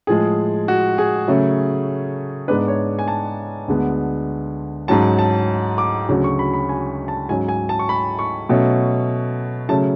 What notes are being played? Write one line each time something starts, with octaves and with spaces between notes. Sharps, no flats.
A2 F3 G#3 G#4
F#4
G#4
C#3 F#3 A3 C#4
G#2 G#3 B3 D4 B4
C#5
G#5
A5
D2 D3 G#3 B3
G#2 F#3 C#4 A5
A5
D6
D2 C#3 F#3 C#4
C#6
B5
B5
G#5
A5
G#2 F#3 C#4 G#5
G#5
A5
C#6
B5
C#6
B2 F#3 A3 C#4
C#3 F#3 A3 C#4 A5